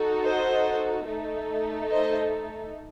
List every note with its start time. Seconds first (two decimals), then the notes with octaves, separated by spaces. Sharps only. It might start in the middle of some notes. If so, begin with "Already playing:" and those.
Already playing: D#4 F#4 A4
0.24 C5 D#5
1.07 A3 D#4 A4
1.90 C5 D#5